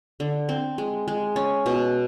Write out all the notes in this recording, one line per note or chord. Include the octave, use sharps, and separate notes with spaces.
D3
C4
G#3
G#3
C#4
B2